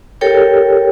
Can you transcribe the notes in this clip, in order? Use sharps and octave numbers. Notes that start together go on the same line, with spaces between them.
G4 A4 A#4 C#5 G5